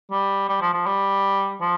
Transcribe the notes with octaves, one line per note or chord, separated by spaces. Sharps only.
G3
G3
F3
F3
G3
F3